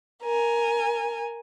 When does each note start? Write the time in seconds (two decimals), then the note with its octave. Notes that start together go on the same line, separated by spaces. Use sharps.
0.23 A#4 G#5